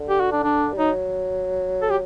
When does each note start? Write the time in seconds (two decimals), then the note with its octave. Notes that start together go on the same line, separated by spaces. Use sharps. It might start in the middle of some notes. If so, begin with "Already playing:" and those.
Already playing: D3
0.09 G4
0.21 F#4
0.32 D4
0.43 D4
0.73 G3
0.78 F#3 D#4
1.82 A4
1.90 G4